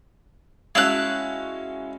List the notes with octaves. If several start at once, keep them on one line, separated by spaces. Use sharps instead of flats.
G#3 C#4 E4 F#4 F5 A5 F#6